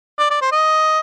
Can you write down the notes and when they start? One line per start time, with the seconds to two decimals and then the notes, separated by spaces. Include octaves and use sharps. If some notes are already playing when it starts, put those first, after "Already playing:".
0.19 D5
0.30 D5
0.41 C5
0.52 D#5